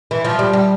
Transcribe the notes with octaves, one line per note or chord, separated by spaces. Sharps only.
E3
F3
G3
G3